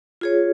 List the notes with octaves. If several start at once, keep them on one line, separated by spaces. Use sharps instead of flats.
F4 G#4 C#5